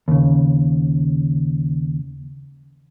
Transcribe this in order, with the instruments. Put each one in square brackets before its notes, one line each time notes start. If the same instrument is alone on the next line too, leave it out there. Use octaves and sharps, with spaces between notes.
[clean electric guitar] D#2 C#3